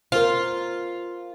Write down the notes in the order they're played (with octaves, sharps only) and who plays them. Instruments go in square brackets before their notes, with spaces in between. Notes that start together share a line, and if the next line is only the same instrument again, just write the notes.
[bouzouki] F4 [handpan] A#4 C5